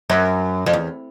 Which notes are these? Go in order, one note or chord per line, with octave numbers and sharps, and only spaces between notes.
F#2
F2
E2